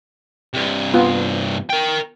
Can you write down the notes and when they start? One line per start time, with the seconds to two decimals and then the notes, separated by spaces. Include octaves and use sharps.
0.54 G2 C3
0.94 B3 F4
1.70 A#4 G5